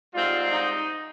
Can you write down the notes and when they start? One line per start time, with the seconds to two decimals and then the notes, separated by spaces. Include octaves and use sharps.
0.14 G#2 G3 C4 F4
0.51 D#4